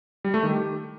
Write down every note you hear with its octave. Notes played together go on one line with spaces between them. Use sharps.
G3
A3
D#3
G4